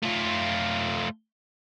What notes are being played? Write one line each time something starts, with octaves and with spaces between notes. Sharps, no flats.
A3 F4